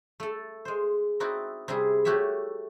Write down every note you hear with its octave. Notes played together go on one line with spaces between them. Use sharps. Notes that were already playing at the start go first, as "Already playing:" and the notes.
A3 A4
G#3 C5
C4 D#4 E4 F#4 D5
C3 G3 E4 G#4
A3 F#4 G4 C#5 E5